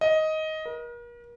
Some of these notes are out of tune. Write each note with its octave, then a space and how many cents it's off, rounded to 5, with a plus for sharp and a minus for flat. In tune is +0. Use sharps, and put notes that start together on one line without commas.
D#5 +10
A#4 +40